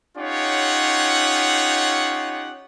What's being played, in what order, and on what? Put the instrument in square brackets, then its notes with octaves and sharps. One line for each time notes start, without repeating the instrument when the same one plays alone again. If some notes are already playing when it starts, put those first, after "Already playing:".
[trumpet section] C#4 D#4 F4 G4 C#5 F#5